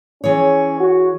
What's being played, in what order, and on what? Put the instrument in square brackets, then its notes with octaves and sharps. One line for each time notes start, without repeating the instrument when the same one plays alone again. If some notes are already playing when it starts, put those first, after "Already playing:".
[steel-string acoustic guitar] E3 G#4 C#5 [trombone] C#4
[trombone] F#4